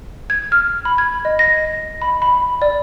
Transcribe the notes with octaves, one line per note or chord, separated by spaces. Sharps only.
G#6
F6
B5
G#6
D#5
A#6
B5
B5
D5